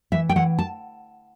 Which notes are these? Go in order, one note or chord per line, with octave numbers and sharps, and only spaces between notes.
E3 E5
G5
E3 F#5
A5